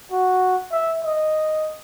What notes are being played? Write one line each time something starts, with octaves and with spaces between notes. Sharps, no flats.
F#4
E5
D#5